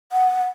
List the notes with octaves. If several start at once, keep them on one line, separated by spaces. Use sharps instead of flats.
F#5